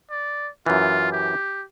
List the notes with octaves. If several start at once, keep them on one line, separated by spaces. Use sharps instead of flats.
D5
F#2 E3 F4
G4